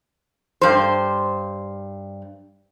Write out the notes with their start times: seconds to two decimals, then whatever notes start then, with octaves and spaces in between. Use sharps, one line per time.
0.61 G2 C5